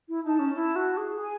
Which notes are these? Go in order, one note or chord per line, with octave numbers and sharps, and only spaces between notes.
E4
D#4 A5
C#4
E4
F#4
G#4
G#4 G#5